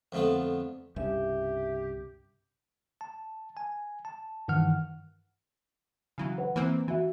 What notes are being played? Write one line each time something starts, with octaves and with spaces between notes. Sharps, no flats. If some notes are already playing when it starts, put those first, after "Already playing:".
F2 D3 A3 B3 F4
C2 G2 C#3 G4 E5
A5
G#5
A5
G2 D#3 E3 F#5 F6
C#3 E3 F#3
B4 F#5
E3 A#3 C4
E3 F#4 E5